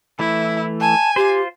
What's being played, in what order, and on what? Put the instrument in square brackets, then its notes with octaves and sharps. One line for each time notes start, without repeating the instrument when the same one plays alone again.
[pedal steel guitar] E3 A3 [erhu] E4
[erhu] G#5 [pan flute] A5
[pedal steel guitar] F4 C5 [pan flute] G4